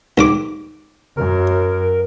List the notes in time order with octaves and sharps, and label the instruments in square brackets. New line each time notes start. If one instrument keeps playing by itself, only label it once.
[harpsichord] D#2 G#2 D6
[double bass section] F#2 [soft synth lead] A#4